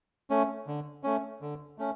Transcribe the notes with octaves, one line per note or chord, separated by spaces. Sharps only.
A3 C#4
D3
A3 C#4
D3
A3 C#4